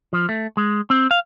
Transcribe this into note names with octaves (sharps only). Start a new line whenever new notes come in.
F3
A3
G#3
C4
F5